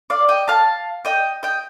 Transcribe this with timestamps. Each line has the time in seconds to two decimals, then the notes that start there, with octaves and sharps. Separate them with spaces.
0.10 D5 F5
0.29 D#5 G5
0.48 F5 A5
1.05 D#5 G5
1.43 D#5 G5